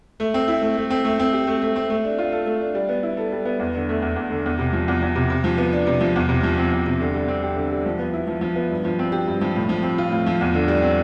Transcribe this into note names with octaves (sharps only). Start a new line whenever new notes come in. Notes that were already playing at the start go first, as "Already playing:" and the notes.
A3
C4
E4
A3
A3
C4
A3
C4
G4
A3
A3
C4
A3
D4
F4
A4
A3
D4
G3
B3
E4
A4
G3
B3
E2
D3
A3
E2
E2
D3
E2
C3
F3
E2
E2
C3
C3
F3
B3
D4
C3
F3
E2
C3
F3
C4
E2
C3
D3
G3
C4
G4
D3
G3
F3
B3
E4
F3
F3
B3
G2
F3
C4
G4
G2
F3
A2
F3
C4
F4
A2
F3
E2
D3
G3
C4